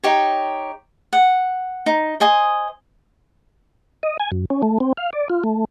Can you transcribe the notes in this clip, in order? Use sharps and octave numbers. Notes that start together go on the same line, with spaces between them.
D#4 G4 C#5
F#5
D#4
C5 D#5 G#5 D#6
D#5
G#5
F#2
C#4
A3
C4
F5
D5
F4
A3